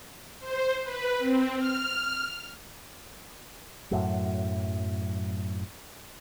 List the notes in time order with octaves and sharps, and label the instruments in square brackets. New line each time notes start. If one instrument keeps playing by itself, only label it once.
[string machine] C5
B4
C4
F6
[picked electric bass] F#2 A2 F#3